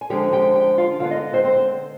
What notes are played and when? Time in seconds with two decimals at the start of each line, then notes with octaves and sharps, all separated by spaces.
0.01 G#5
0.10 D3 F3 G#3 C4 G4 G5
0.33 G4 G5
0.55 G4 G5
0.78 F4 F5
0.99 D3 G#3 B3 F4 F5
1.11 D#4 D#5
1.33 C4 C5
1.44 C4 C5